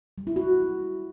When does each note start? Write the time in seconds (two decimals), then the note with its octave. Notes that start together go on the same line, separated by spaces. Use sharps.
0.18 G3
0.27 E4
0.36 F#4